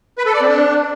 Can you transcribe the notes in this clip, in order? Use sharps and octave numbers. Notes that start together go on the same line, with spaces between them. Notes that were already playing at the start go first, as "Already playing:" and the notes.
B4
A4
D5
C4
D4